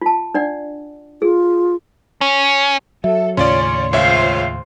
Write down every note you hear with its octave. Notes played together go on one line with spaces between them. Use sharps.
F4 A5
D4 D5 F#5
F4 G#4
C#4
F#3 A4 E5
D#2 A2 C#3 C#4 F4 C#5 D5 C6
C#2 F4 C5 C#5 E5 F5